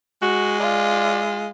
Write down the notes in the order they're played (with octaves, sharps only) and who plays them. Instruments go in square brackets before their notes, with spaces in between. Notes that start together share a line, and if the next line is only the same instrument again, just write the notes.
[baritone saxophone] G#3 [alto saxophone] F#4
[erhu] F4 [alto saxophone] D5